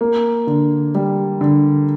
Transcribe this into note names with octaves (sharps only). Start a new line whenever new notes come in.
A#3
D3
G3
D3